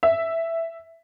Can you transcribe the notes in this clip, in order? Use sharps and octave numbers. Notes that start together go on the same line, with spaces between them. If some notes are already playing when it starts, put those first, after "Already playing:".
E5